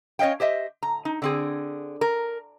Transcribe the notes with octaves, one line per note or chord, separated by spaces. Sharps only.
C#4 C#5 D#5 F5 G5
G4 C5 D#5 E5
A#5
D#4
D3 C4 G#4
A#4